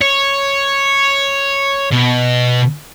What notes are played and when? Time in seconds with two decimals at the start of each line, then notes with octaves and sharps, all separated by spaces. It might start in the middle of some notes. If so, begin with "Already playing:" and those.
0.02 C#5
1.92 B2